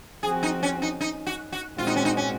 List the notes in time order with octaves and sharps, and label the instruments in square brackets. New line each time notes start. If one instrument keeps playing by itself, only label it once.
[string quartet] F3 C4 F#4 [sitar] G#4
[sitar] D#4
C#4
D#4
D#4
F#4
F#4
[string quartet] A#2 G#3 C4 F#4 [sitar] F4
[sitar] D#4
C#4
D#4
C#4